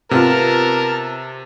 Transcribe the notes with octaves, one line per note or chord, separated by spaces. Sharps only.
C3 B3 C4 F4 A#4 A5 F6